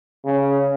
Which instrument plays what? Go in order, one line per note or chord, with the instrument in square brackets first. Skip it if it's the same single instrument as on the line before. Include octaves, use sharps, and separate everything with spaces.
[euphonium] C#3